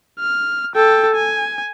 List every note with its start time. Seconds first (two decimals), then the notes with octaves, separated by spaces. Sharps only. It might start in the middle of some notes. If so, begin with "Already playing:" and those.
0.20 F6
0.75 A4 G5
1.15 G#5